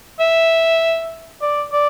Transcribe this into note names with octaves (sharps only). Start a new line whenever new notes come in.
E5
D5
D5